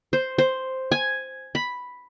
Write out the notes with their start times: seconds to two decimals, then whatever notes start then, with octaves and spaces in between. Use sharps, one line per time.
0.13 C5
0.38 C5
0.91 G#5
1.55 B5